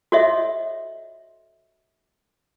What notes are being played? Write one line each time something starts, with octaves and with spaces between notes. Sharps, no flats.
F#4 A4 C#5 D#5 E5